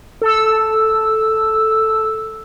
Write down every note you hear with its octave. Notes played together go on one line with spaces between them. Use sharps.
A4 E6